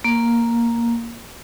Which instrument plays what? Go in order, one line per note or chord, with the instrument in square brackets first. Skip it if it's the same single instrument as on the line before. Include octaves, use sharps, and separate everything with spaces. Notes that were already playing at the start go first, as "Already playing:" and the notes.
[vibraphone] A#3